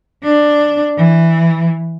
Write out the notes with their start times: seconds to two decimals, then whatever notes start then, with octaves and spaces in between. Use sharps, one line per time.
0.23 D4
0.97 E3